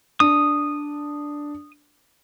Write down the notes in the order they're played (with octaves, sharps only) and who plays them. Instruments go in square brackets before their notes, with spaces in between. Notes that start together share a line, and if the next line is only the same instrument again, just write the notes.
[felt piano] D4 [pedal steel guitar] D#6